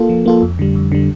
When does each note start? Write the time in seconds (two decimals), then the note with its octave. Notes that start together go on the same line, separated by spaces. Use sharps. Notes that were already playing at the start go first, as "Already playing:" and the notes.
Already playing: A#3 F4 A4
0.09 F3
0.26 A#3 F4 A4
0.42 F2
0.59 D3 G3
0.75 F2
0.92 D3 G3